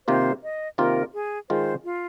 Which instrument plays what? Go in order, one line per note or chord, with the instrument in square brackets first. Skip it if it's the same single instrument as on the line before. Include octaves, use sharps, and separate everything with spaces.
[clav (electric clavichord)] C3 D#3 A#3 F4 [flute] C5
[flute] D#5
[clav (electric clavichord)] C3 D#3 A#3 F4 [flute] A#4
[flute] G#4
[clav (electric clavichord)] D#3 G#3 F4 [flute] C5
[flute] F4